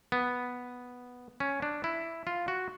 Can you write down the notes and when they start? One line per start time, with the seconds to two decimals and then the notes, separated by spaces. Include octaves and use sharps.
0.12 B3
1.40 C#4
1.62 D4
1.84 E4
2.27 F4
2.48 F#4